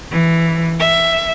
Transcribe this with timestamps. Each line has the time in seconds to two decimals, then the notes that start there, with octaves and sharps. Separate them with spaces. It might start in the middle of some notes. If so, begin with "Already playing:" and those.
0.10 E3
0.79 E5